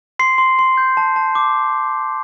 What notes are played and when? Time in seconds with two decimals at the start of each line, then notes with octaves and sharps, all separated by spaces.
0.19 C6 C7
0.38 C6
0.59 C6
0.78 G6
0.97 A5
1.16 A5
1.35 D6